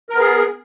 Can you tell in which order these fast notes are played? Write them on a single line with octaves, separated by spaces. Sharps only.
A#4 B3 G#4